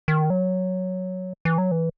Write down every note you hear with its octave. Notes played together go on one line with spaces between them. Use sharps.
D#3
F#3
E3
F#3
E3